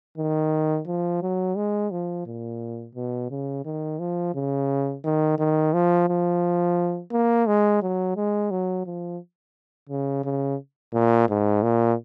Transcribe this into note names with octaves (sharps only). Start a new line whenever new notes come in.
D#3
F3
F#3
G#3
F3
A#2
B2
C#3
D#3
F3
C#3
D#3
D#3
F3
F3
A#3
G#3
F#3
G#3
F#3
F3
C#3
C#3
A#2
G#2
A#2